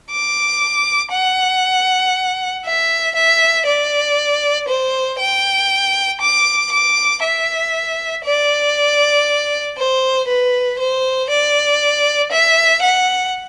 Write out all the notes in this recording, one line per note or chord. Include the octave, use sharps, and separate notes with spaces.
D6
F#5
E5
E5
D5
C5
G5
D6
D6
E5
D5
C5
B4
C5
D5
E5
F#5